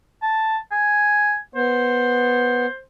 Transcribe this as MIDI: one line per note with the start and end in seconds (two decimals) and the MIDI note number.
0.22 0.57 81
0.72 1.37 80
1.55 2.66 59
1.55 2.80 72